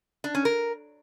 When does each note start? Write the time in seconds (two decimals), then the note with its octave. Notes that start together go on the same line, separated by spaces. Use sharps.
0.24 D4
0.35 C#4
0.45 A#4